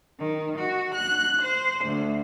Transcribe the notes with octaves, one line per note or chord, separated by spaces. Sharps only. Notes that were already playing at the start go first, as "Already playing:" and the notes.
D#3
F#4
F#6
C5
D2